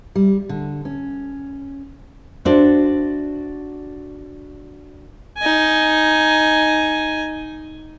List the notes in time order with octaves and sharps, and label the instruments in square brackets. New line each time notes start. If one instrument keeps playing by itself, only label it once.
[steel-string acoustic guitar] G3
D3
C#4
[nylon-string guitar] D4 F#4 A4 C5 E5
[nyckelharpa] D#4 G#5